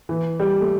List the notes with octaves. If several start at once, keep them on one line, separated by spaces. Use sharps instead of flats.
E3
G3
A3